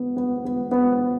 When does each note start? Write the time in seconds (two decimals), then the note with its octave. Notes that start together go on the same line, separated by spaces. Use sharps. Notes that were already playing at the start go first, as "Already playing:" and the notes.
Already playing: B3
0.16 B3
0.45 B3
0.71 B3